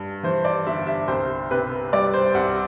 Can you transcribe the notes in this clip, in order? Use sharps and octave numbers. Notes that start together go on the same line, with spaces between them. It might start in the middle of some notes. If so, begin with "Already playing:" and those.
Already playing: G2
E3 C5
D5
G1 E5
E5
C2 C5
C3 B4
G3 D5
C5
C2 F#5